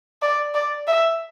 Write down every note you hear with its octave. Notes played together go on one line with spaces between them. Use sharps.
D5
D5
E5